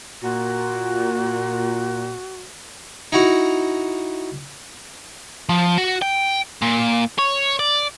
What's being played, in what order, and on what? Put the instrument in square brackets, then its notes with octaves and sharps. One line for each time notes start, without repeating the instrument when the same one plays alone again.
[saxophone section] A#2 [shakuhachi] F#4
[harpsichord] D#4 E4 F#4 A#5
[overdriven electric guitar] F3
F#4
G5
A#2
C#5
D5